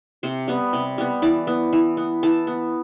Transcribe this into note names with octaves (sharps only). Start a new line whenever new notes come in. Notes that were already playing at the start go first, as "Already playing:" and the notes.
C3 C5
G3 B3
C3
G3 B3
E3 D5
B3
E3
B3
E3 A5
B3